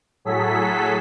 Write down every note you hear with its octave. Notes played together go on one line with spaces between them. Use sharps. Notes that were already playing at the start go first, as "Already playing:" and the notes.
A2 F#3 G#4 A4 B6